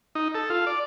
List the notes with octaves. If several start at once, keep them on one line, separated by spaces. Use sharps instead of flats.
D#4
A4
F4
D5